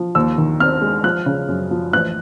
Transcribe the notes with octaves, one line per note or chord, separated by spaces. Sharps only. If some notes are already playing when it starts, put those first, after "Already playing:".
Already playing: F3
D#2 E6
D#3
C4 F6
G#3
F3 F#6
C#3
F#2
F3
A1 F#6